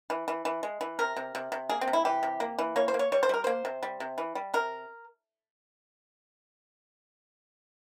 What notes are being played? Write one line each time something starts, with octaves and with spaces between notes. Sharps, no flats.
E3
E3
E3
G#3
E3
C3 A#4
C3
C3
C3
A#3 G#4
C4
C3
E4
E3 G4
C3
A#3
E3
A#3 C#5
C5
A#3
C#5
G3 C#5
C5
G3 A#4
A#3 C5
C3
G3
C3
E3
G3
C3 A#4